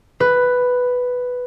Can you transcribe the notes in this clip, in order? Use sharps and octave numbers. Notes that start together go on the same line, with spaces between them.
B4